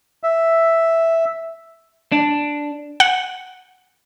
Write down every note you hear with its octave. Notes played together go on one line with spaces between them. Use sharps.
E5
D4
F#5